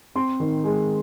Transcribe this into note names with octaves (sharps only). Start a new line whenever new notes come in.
C4 C6
D#3
G#3